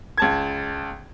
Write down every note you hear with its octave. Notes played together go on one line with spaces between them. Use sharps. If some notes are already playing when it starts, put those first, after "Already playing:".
C#2 A5 G#6